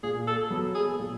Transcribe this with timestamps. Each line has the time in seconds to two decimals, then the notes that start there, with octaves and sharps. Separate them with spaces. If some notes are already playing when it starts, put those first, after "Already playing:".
0.03 A#2 G#4
0.27 A4
0.50 F#3 B3
0.75 G#4
0.99 A#2